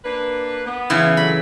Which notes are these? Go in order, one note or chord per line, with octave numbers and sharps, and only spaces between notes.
A#3 D4 B4
B3
C#3 E3
A#2 D3 F#3 B5